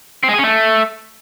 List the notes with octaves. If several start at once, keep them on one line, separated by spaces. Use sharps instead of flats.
C4
G#3
G#4
C#4
A3